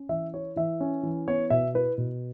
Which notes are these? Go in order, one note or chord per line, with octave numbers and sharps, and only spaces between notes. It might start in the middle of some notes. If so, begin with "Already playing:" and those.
Already playing: C#4
E3 E5
E4 C#5
E3 E5
C#4
E3
B3 C#5
B2 E5
E4 B4
B2